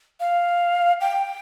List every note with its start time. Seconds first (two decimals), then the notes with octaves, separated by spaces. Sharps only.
0.20 F5
1.01 G5